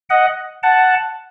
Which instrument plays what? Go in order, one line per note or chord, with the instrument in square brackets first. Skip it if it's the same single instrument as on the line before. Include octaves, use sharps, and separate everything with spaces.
[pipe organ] D#5 F#5
F#5 A5